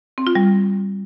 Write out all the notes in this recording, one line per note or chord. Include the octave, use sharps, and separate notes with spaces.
C4
F4
G3